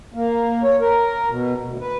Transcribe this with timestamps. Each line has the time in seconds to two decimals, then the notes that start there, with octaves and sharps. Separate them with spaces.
0.14 A#3
0.63 C#5
0.80 A#4
1.29 B2
1.65 D2
1.80 B4